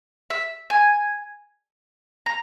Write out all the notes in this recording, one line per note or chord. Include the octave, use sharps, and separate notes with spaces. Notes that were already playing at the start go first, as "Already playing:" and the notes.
E5
G#5
A#5